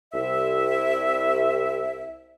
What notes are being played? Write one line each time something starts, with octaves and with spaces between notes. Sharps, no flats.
C2 E5